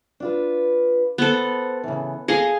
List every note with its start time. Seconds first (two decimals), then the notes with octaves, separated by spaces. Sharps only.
0.20 D4 F4 B4
1.18 B3 A4 C5
1.83 C#3 E3
2.28 G#4 A4 D#5 F5 A5